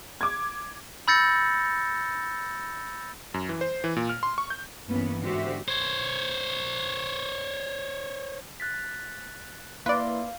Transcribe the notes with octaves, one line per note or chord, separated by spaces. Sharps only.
D6 G#6
B5 E6 G6 A6 A#6 C#7
F#2
E3
C5
E3
A#2
F6
C6
C#6
G6
G2 E3 A#3 B3 C#4
G#2 D3 F#4 G4 C5 E5
C5 C#5
F#6 A6 B6
A#3 E4 B4 D5 F5 C6